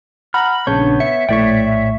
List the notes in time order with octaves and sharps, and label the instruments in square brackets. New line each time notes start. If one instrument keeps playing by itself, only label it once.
[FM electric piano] F#5 A#5 [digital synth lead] B5 [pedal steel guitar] F6
[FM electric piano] A#1 C#3 G6 [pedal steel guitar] B3 C#5 [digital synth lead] D4
[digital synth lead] E5 [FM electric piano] C#7
[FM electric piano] A#1 A2 C#6 [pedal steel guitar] C#5 D5 G5 [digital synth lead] E5